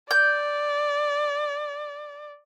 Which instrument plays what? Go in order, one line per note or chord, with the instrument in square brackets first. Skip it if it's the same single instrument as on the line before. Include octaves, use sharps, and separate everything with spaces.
[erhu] D5 [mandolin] G6